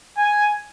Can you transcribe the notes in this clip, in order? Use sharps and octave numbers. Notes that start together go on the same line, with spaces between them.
G#5